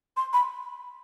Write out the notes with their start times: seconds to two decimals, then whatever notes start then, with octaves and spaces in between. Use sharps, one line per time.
0.17 C6
0.33 B5